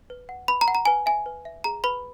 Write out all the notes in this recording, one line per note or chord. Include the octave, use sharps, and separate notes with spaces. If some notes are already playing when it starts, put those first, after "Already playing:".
B4
F#5
B4 B5
A#5
F#5
A#5
B4 G#5
E5 G#5
B4
E5
G#4 A#5
B4 B5